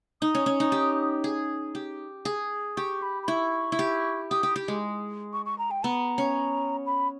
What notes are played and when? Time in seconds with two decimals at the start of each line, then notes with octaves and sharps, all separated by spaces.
0.21 D#4 D#6
0.35 C#4
0.46 C#4
0.60 D#4
0.72 G4
1.24 G#4
1.75 G4
2.25 G#4
2.77 G4 C#6
3.02 B5
3.23 B5
3.28 E4 C#6
3.72 E4
3.79 G4
4.30 G4 D#6
4.43 G4
4.56 G4
4.68 G#3
5.33 C#6
5.46 C#6
5.58 A#5
5.71 G5
5.84 B3 A#5
6.18 C#4
6.86 B5